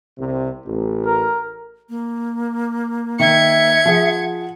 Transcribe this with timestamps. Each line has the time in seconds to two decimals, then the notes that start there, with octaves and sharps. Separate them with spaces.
0.18 C2 C3
0.65 A1
1.06 A#4
1.89 A#3
3.19 D#3 E5 G#6 C#7
3.86 F3 G#4 F#5